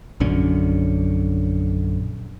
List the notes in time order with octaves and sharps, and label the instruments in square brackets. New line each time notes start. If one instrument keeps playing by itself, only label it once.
[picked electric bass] A#1 F#2 D3 C#4